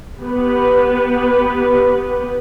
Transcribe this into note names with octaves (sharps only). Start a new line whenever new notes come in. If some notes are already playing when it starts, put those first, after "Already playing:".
B3 G4 B4